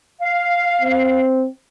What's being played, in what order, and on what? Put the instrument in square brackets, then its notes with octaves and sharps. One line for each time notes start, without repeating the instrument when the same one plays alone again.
[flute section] F5
[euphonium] C4